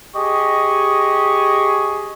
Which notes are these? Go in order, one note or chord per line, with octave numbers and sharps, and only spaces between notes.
G4 G#4 D#5 C#6